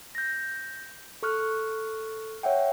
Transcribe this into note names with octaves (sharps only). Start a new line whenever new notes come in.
G6 A#6
A4 C#6 F6 F#6
C#5 E5 F#5 G5